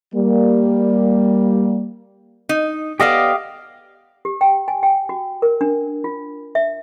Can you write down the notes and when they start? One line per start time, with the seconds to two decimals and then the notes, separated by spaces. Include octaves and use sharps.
0.14 G3 A#3
2.49 D#4
3.00 B3 G4 A4 D5 D#5 F5
4.25 G4
4.41 G5
4.68 G#5
4.83 G5
5.09 F#4
5.42 A#4
5.61 D4
6.04 F4
6.55 E5